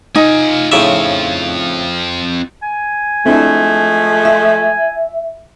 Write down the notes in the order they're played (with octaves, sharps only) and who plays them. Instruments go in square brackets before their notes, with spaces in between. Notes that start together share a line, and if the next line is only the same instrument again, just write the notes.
[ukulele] D#4 [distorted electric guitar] F4 G#5
[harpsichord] A2 C#3 E5 [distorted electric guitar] C4 F4
[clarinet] G#5
[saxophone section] F3 G#3 A3 [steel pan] C4 D4 E4
[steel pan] F4 [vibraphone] E5